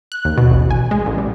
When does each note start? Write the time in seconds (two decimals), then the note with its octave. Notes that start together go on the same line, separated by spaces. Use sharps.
0.12 F#6
0.25 D#2
0.38 B2
0.51 A1
0.71 G#5
0.91 G#3
1.06 A1
1.18 G3